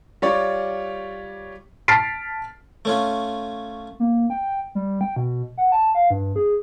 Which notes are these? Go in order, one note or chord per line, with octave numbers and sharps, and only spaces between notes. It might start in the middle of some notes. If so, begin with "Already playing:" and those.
G3 F4 C#5 D5
A5 F6 A6 B6 C7 D7
A3 C#4 F4
A#3
G5
G3
G5
B2
F#5
A5
F5
G2
G#4